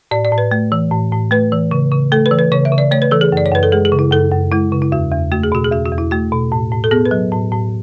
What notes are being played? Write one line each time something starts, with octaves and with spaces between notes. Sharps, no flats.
A2 D5
D5
A2
B4
A3
E3
A2
A2
A3 B4
E3
C#3
C#3
A3 A4
B4
E3
B4
C#3 C#5
E5
C#3
D5
A3 C#5
B4
E3 A4
G#4
F#2 D5
C#5
F#2 B4
A4
G#3 G#4
G#4
C#3
E4
F#2 A4
F#2
G#3 E4
C#3
E4
E2 F#4
E2
A3 F#4
G#4
B2 F#4
G#4
E2 F#4
F#4
E2
E4
A3 F#4
B2
A2
A2
A4
B3 G#4
B4
F#3
A2
A2